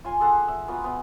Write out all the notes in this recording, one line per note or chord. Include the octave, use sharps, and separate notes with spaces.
F4 G#5 C6
G#4 A4 F#5 C6
E5
B3 F4 F#4 A#5
B3 E5 F5